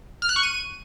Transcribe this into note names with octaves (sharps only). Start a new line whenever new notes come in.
F6
F#6
C#6
D#7